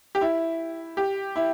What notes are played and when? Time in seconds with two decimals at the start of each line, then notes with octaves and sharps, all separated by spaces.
0.15 G4
0.21 E4
0.97 G4
1.36 E4